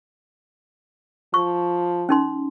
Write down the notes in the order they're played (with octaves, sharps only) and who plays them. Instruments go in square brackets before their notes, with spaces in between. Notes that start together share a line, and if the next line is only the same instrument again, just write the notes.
[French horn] F3 [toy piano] C#6
[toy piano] C#4 D#4 C6